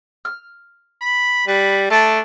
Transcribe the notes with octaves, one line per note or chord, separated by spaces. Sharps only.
F6
B5
G3 B4
A3 D4 A5